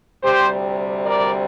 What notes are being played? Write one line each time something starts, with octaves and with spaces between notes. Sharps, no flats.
D2 C3 G3 G4 C5
A#4 D5